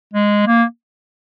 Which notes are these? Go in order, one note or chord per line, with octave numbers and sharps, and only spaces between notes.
G#3
A#3